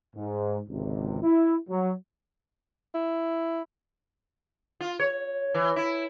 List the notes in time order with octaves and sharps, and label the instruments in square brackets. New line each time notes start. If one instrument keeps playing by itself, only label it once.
[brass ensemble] G#2
G#1 C#2 C3
E4
F#3
[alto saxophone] E4
[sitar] F4
C#5
E3
E4